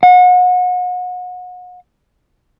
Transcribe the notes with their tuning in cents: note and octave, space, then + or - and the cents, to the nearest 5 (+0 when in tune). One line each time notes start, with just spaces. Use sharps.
F#5 -35